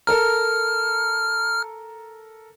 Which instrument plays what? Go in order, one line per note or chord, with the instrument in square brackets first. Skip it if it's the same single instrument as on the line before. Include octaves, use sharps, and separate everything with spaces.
[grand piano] A4 A#4 A#5 [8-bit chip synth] F6